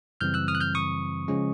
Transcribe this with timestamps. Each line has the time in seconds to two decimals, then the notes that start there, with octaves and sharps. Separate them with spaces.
0.21 F#2 C#3 E3 G3 C4 F6 G6
0.34 E6 F#6
0.48 D#6 F6
0.55 F#6
0.60 F6 G6
0.75 C#6 D#6
1.28 C#3 F3 G#3 C#4